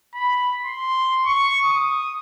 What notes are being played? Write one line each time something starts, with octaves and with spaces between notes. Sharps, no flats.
B5
C6
C#6
D#6